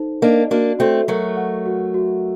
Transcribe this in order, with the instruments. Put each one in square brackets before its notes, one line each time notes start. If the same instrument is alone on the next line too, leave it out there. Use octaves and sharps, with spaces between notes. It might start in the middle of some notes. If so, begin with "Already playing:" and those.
Already playing: [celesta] D#4 A4 C5
[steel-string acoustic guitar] A#3 D4 [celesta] D#5
[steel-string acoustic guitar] A#3 D4 [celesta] F#4
[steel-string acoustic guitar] A3 C4 [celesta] F#4
[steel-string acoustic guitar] F#3 A3 [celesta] A#4
[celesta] F#5
F#4
F#4